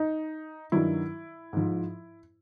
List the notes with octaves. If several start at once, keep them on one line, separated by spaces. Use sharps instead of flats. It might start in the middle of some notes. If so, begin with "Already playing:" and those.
Already playing: D#4
G2 D#3 F#3 E4
G#2 F3